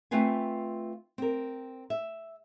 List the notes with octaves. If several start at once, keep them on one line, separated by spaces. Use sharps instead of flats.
A3 C4 F4 B4 F5 G#5
C4 A#4
E5